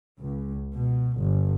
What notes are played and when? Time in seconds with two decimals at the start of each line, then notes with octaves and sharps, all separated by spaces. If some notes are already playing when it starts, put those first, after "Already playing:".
0.18 C#2
0.75 B2
1.18 G1